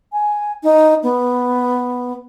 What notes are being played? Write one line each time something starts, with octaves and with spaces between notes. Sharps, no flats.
G#5
D#4
B3